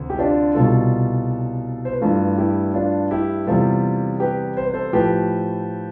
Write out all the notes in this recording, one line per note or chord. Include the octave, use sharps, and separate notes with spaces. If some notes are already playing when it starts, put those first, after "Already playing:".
Already playing: D2 C3
G4
D4 F4
C2 B2 G3 F4 A4
C5
B4
G2 E3 A3 F4 A4
E4 G4
D4 F4
E4 G4
E2 C3 G3 F4 A4
G4 B4
C5
B4
A4 C5
A2 F3 A3 G4 B4